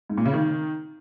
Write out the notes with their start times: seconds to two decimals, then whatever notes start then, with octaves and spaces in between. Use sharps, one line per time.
0.10 G#2
0.18 A#2
0.26 C#3
0.34 D#3